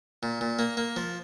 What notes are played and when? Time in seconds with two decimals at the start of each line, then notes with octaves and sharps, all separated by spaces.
0.23 A#2
0.41 A#2
0.59 A#3
0.77 A#3
0.96 F3